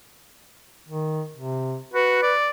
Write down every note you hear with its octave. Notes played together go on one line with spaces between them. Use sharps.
D#3
C3
F#4 B4
D5